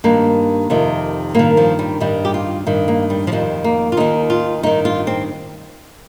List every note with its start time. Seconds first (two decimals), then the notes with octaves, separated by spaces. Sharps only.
0.04 G2 D#3 A#3
0.70 F2 C3 D#3
1.35 G2 D#3 A#3
1.57 F3
1.79 G3
2.00 G2 D#3 G3
2.25 G4
2.34 F4
2.67 G2 D#3
2.88 A#3
3.10 G3
3.27 F3
3.32 F2 D#3 G3
3.64 A#3
3.92 F4
3.97 D#2 D#3 D#4
4.30 F4
4.63 G2 D#3 D#4
4.85 F4
5.07 C4